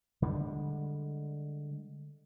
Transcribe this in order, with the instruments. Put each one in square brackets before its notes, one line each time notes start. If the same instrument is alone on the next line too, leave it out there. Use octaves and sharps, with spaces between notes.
[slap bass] D3 G3 G#3